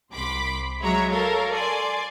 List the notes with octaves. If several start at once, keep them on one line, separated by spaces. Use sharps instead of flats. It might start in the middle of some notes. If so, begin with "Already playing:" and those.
C2 B5 C6 D6 B6
F#3 G#3 C#5 E5 A#5
A4 A#4 C#5 F5
D5 G#5 C6